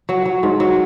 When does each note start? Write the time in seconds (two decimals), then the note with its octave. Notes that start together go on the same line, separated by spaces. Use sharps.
0.09 F#3
0.25 F#3
0.43 G#2
0.60 F#3